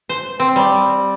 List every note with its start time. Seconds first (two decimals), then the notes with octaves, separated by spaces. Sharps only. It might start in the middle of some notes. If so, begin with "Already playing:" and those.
0.09 C5
0.40 C4
0.56 G3